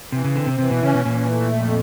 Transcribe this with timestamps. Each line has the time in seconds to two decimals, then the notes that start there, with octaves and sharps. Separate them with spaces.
0.12 C3 E3
0.25 C#3
0.36 D3 C4
0.47 C3
0.58 C3 E3
0.71 B2
0.82 C#3 C#4
0.95 B2
1.05 A#2 E3
1.29 A3
1.53 F2